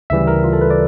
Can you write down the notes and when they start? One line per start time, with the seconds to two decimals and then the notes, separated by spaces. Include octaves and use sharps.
0.10 D2 C#3 E3 G3 E5
0.27 A#4
0.44 F4
0.53 A4
0.61 B4
0.70 D5